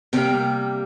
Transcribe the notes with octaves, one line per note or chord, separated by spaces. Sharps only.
C3 G3 A#3 G5